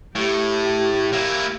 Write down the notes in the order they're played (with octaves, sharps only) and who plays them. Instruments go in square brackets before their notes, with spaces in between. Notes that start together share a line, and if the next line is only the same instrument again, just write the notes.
[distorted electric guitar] A2 [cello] G4
[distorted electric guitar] A#3 E4